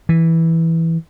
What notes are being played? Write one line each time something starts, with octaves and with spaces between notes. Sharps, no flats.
E3